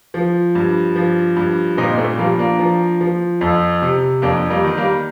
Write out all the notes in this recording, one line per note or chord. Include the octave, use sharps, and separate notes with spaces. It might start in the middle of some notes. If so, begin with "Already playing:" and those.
F3
G2
F3
G2
A#2 C4 D#4
A3 C4
F3 G3 A#3
A#3 D4
F3
F3
F2
C3
F2 A#3 D4
G3 A#3
D#3
G3 A#3